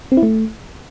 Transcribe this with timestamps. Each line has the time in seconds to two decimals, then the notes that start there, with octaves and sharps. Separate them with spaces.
0.12 C4
0.17 E4
0.23 A3